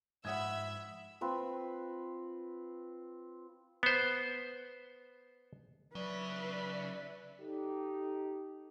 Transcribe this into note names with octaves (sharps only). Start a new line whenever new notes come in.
G#2 F3 E5 F#5 B5 D#6 E6 G#6
C4 F4 B4
B3 C5
C#3 F#3 B4 D5 E5
D#4 G4 A4